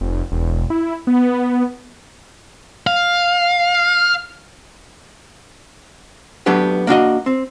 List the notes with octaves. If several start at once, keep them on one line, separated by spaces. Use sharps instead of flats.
F1
E1
E4
B3
F5
F#3 A3 B3 D4 G4
A#3 D4 F#4 D#5
C4